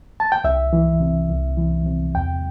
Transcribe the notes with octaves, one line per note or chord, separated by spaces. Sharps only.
A5
G5
C2 E5
E3
C3
C2
E3
C3
E2 G5